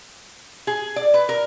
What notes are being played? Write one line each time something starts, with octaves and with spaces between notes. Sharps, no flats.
G#4
D5
B4
A#4